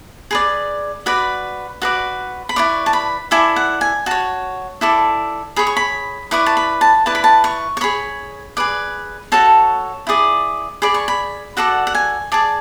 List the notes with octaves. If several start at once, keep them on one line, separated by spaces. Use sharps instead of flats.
G#4 B4 D5
F#4 B4 D5 B5
F#4 B4 D5
B5
E4 B4 D5 C#6
A5
B5
E4 A4 D5 G#5
F#5
G#5
F#4 C#5 A5
E4 A4 D5
G#4 C#5 B5
C#6
B5
E4 B4 D5 C#6
A5
B5
A5
E4 B4 D5 A5
B5
A5
C#6
C#6
G#4 C#5 B5
G#4 B4 D5
F#4 A4 C#5 A5
E4 G#4 D5
G#4 D5 B5
C#6
B5
F#4 A4 D5 F#5
F#5
G#5
G#4 D5 A5